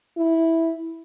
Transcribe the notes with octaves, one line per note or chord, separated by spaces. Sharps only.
E4